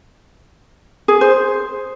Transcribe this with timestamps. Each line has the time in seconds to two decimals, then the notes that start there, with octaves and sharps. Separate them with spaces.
1.08 G#4
1.21 C5